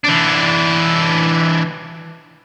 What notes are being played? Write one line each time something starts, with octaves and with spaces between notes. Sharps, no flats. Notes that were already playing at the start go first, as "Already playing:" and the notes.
E3 D4